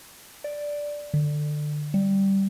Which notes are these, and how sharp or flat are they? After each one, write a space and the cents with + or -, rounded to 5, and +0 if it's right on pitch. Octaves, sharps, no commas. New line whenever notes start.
D5 +0
D3 +20
G3 -5